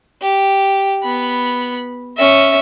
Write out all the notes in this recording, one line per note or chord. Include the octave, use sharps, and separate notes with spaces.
G4
B3 B5
C#4 E5